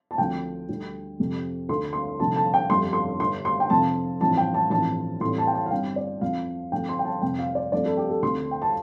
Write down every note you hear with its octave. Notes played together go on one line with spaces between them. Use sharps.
A5
D2 D3 F3 C4 G5
D2 D3 G3
F2 C3 F3
D2 D3 A3 C6
C6
F1 F2 D3 A3 A5
A5
G5
G1 F2 D3 G3 C6
C6
G1 G2 D3 C6
C6
G5
F1 F2 F3 C4 A5
A1 G2 F3 C4 A5
G5
A5
A1 G2 F3 C4 A5
A1 A2 G3 C4 C6
A5
G5
A5
F5
G1 G2 G3 C4 G5
D5
F2 F3 C4 F5
G2 D3 F3 A3 C4 G5
C6
G5
A5
F1 F2 F3 C4 G5
F5
D5
G2 F3 A3 C4 D5
A4
G4
A4
D2 D3 A3 C4 C6
G5
A5